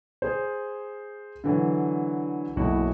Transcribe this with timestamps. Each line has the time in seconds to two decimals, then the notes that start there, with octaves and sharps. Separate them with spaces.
0.22 G#4 C5
1.44 D3 E3 F#3
2.56 F#1 B1 E4 F#4